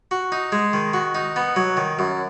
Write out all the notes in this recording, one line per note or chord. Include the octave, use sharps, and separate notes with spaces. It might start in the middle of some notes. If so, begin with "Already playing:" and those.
F#4
D#4
G#3
D#3
F#4
D#4
B3
F#3
D#3
F#2